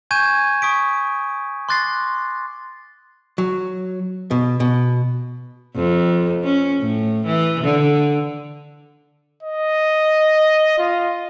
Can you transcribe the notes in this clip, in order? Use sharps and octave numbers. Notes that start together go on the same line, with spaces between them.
G#5 C#6 G6 G#6 D#7 E7
C#6 D#6 B6 D7
C6 D6 F#6 A6 A#6 C7
F#3
B2
B2
F2
C#4
A2
E3
D3
D#5
F4